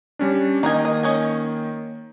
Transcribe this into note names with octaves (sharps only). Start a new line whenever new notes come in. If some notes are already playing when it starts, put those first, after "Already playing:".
G3 C#4 D4
D#3 A#3 D#4 D#5 G#5
D#5
C#4 D#5 G#5